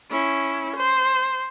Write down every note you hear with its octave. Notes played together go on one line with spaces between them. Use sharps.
C#4 E4
C5